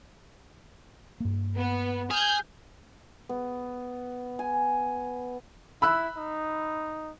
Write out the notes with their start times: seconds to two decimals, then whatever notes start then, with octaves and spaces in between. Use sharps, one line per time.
1.20 G2 A#3
1.56 B3
2.11 G#4 F6 G6 G#6
3.29 B3
4.39 G#5
5.82 E4 B5 E6 F#6
6.17 D#4